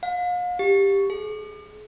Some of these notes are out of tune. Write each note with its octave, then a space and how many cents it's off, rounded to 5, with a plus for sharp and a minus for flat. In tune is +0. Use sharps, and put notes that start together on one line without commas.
F5 +40
G4 +10
G#4 +40